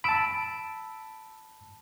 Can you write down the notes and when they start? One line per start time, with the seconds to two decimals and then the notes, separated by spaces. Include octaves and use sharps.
0.04 A5 B5 E6 D7